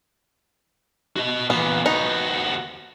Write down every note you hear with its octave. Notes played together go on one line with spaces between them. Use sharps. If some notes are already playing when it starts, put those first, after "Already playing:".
F#4 D#5
E2 A#2 B3
D#2 B3 D#4 F#4